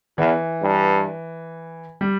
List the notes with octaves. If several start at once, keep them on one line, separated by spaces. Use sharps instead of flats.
E2 E3
G2
G3